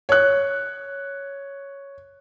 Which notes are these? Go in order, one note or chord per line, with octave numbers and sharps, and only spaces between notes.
C#5 F#6